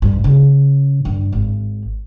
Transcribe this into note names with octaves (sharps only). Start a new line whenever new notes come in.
G2
C#3
G2
G#1